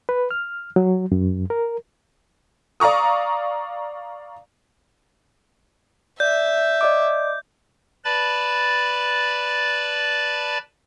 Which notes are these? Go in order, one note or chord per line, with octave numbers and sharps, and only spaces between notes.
B4
F6
F#3
F#2
A#4
D5 F5 A#5 C#6 D#6
D5 E5 G6
D5 D#5 D6
B4 D5 A5 B5 A6